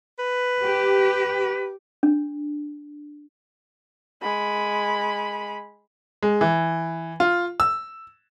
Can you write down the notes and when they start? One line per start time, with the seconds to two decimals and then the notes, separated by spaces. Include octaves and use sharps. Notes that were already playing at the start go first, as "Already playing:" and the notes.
0.19 B4
0.63 G4
2.03 D4
4.22 G#3 B5
6.23 G#3
6.41 E3
7.20 F4
7.60 E6